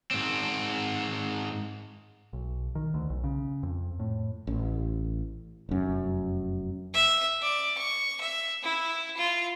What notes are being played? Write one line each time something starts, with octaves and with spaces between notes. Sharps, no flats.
G#2 C4
B1
D#3
D2
B1
C#3
F2
A2
A1
F1 F#2
E5
D5
C#6
E5
E4
F4